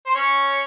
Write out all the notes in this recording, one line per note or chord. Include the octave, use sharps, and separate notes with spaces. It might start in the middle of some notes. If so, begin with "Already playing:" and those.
C5
C#4 C#5